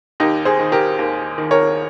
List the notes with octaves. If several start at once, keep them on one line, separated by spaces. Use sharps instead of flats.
D#2 D#4 G4
G#4 C5
D#3
G4 A#4
D#2
D#3
A#4 C#5